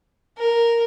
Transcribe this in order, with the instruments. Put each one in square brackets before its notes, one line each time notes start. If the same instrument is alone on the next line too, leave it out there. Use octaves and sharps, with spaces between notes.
[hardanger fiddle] A#4